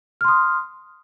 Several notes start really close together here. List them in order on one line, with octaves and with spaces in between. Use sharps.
F6 C6 D#6